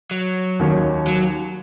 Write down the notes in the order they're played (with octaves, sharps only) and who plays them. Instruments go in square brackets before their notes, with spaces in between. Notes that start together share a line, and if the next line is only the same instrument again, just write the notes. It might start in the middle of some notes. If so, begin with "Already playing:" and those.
[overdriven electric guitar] F#3
[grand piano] D#2 D#3 A#3 C#4 F#4
[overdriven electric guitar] F#3